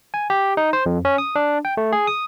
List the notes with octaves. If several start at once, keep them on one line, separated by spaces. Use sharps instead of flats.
G#5
G4
D#4
C5
F2
C#4
D#6
D4
G5
A3
G#4
D#6